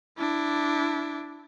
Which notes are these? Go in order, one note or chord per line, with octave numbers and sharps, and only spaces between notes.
D4 E4